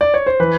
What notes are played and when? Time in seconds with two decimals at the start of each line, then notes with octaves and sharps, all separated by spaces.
0.01 D5
0.14 C#5
0.26 C5
0.40 E3 B4